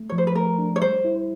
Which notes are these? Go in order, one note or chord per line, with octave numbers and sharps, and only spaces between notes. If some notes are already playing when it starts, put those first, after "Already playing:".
Already playing: A3
F3 C#5
C5
B4
A3 A#4
D4
C#5
G3 C5
E4